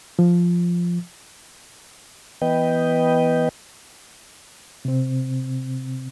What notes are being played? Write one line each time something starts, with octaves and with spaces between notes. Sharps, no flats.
F3
E3 B3 B4 D#5 G5
C3 C4